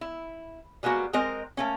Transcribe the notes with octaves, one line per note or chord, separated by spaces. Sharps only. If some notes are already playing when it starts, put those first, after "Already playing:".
E4
G3 G#3 A#3 B3 F#4
G#3 C4 A#4 C5 D#5
A3 A#3 C#4